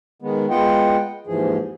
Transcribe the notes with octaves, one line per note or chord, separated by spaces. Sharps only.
D#3 G#3 B3
G#3 B3 F4 D#5 F#5 G5
D#2 G#2 E3 F3 G#4